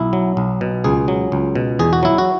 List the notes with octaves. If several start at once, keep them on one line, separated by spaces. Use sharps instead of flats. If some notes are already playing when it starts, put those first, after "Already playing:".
Already playing: B1 E4
F#3
B1
B2
C#2 G#4
F#3
C#2
B2
E2 G#4
F#4
F#3 E4
F#4